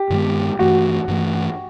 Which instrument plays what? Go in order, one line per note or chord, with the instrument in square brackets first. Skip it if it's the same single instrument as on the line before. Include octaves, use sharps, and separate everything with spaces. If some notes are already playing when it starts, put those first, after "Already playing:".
Already playing: [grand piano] G4
[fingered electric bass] G2 D#3 G#3 B3
[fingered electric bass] G2 E3 A3 [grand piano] F#4
[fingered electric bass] G2 E3 A3